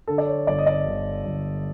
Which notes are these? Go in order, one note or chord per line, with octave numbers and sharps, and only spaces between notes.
D3 A4
D5
C#5
G1 D5
D#5
D5
G1
G1